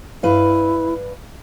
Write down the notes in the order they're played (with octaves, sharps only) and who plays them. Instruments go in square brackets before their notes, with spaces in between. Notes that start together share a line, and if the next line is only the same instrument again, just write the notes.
[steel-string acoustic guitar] G2 B4 F5 [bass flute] E4